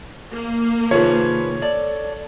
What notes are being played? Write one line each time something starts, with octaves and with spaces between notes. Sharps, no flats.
A#3
C3 D#3 F3 G#4 B4 C#5
A4 D5